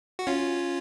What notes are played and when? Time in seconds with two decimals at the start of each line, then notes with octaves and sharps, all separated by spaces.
0.19 F#4
0.27 C#4 F4